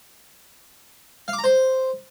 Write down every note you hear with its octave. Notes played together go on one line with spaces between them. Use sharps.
F5
D6
A#5
C5